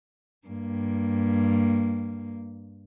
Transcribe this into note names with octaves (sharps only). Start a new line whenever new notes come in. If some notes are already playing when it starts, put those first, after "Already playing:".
G2 A#3